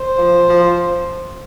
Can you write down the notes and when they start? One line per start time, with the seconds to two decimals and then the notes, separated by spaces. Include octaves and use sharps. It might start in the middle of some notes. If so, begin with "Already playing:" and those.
Already playing: C5
0.16 F3
0.47 F3